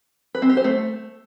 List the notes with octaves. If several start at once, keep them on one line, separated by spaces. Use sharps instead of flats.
B4
C4
G4
C5
A3